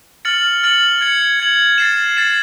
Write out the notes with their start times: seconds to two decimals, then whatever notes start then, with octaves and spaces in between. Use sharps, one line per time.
0.25 F6 A6 C#7 F#7
0.63 F6 A6 C#7 F#7
1.01 G#6 C#7 F#7
1.40 G#6 C#7 F#7
1.78 A6 C7 E7
2.17 A6 C7 E7